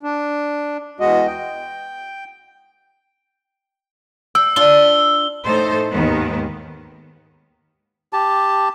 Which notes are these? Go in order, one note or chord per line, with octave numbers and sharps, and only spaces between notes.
D4
E2 G#3 F#4 D#5
G5
G5 E6
D4 F4 G7
A2 D#4 A4 C5
D#2 G#2 D#3 B3
G4 A5